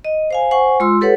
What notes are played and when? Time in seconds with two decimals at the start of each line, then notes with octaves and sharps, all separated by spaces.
0.05 D#5
0.31 C5 F5 G#5
0.51 C5 F#5 G#5 C#6
0.80 G#3 F4 C6 E6
1.01 G4 A4 B4 C#5 F#5